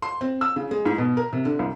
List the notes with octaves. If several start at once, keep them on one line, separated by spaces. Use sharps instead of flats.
C6
C4
E6
C#3
G#3
G#2
B2
A#4
C3
D3
C2